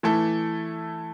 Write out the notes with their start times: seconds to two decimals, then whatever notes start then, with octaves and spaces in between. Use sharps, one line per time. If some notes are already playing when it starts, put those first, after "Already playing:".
0.03 E3 A3 E4 A4